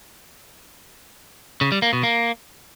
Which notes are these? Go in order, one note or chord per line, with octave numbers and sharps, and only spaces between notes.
C#3
G3
A#3
B2
A#3